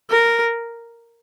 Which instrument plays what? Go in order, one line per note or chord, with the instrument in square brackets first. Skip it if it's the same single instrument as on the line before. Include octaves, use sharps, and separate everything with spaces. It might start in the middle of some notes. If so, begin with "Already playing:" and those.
[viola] A#4